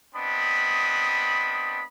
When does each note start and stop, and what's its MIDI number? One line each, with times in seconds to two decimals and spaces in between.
0.16 1.83 59
0.16 1.83 60
0.16 1.83 62
0.16 1.83 75
0.16 1.83 83
0.16 1.83 87